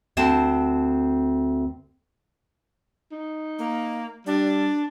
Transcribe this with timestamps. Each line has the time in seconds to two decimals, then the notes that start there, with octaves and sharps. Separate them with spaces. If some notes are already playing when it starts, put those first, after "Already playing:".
0.17 D2 C4 A5
3.12 D#4
3.58 A#3
4.26 G3 D4